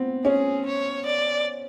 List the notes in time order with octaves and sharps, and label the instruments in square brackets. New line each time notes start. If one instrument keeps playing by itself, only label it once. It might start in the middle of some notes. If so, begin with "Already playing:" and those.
Already playing: [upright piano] B3 C4
[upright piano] C#4 [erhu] G#4
[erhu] C#5
D5